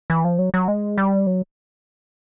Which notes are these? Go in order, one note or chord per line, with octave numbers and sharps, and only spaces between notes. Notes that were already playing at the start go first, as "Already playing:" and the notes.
E3
F3
F#3
F#3
G#3
G3
F#3